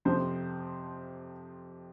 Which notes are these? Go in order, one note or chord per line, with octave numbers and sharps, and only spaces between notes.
F2 C3 F3 C5